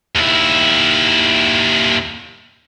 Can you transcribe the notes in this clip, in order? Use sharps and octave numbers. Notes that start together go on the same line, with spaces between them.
D#2 E4